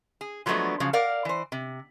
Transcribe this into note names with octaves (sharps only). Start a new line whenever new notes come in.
G#4
F3 F#3 G#3 A3 B3 D4
C#3 F3 F#3
A#4 D5 F5 F#5
E3 C5
C3